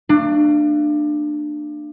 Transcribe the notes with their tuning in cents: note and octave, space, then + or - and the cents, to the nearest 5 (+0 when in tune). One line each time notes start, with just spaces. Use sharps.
A#3 -40 D4 +25